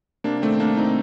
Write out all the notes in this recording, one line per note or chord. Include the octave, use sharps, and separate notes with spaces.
C3 A#3 D4
D4
D#3 A3 C4
C2 A#3 D4
C3 C4 D#4